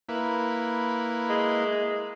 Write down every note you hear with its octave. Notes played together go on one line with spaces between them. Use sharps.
A#3 E4 B4
G#3